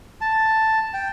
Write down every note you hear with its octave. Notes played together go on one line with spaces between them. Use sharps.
A5
G5